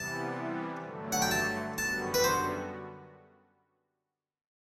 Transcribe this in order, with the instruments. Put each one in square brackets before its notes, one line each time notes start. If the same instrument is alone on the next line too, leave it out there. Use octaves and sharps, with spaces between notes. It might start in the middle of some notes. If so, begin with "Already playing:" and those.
Already playing: [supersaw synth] C3 E3 G3 B3 [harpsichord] A5
[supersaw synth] G2 D3 F#3 A3
[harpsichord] F#5
G5
A5
[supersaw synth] F#2 D3 G3 B3 F#4 [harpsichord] A5
[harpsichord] B4
C5